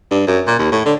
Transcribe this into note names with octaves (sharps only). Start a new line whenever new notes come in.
G2
F#2
A#2
D#2
A2
D3